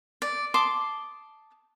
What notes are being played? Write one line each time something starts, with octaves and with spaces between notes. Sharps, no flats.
D5
A5 C6 D6 D#6